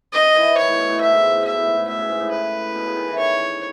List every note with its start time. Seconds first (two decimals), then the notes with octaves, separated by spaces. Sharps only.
0.13 D#3 D#5
0.35 E3
0.56 D#3 C#5
0.68 A2
0.78 B2
0.89 A2
1.00 B2 E5
1.11 G#2
1.22 G#2
1.33 A2
1.44 B2 E5
1.55 A2
1.65 G#2
1.76 A2
1.87 B2 E5
1.99 C#3
2.09 G#2
2.20 A2
2.31 B4
2.75 B2
2.86 C#3
2.96 D#3
3.08 E3
3.18 D#3 C#5